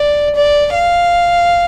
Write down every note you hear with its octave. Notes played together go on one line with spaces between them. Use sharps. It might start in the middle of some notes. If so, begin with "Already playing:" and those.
Already playing: D5
D5
F5